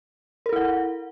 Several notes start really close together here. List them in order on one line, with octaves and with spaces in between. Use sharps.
A#4 A4 E4 F#5